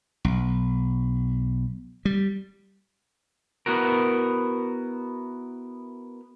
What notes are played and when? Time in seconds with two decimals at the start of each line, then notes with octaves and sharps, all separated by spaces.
0.25 B1
2.05 G3
3.66 B3 E4 F#4 A#4